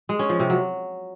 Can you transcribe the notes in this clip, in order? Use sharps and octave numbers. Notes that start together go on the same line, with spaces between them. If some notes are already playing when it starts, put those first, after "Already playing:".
G#3
C#4
F3
C3
F#3